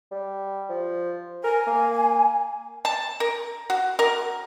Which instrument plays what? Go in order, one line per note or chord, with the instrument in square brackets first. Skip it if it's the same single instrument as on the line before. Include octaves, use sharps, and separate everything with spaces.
[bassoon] G3
F3
[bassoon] A#4 [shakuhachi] G#5
[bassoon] A#3
[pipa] A5
A#4
F#4
A#4